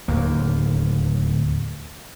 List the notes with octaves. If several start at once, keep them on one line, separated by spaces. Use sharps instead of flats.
D1 D#2 A#3